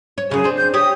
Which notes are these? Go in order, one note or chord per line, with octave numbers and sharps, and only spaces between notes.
C#5
F#2 C#3 G#4
C4 D4
G6
G4 C#5 D#6